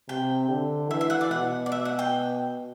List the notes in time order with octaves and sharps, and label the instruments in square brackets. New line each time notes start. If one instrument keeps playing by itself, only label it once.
[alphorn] C3 [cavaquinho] G5
[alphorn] D3
[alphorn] E3 [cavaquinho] E5
[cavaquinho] E5
F#5
D5
[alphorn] B2 [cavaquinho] F#5
[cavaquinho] D5
E5
F#5
G5